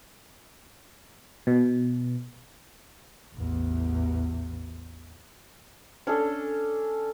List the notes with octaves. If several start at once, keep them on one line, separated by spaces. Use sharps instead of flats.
B2
A1 E2
C#4 D4 A4